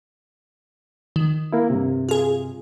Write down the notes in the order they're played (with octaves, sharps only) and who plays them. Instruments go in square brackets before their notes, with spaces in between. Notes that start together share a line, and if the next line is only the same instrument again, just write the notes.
[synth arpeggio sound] D#3
[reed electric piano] A#3 E4
G2 C3
[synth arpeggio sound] F4 G#4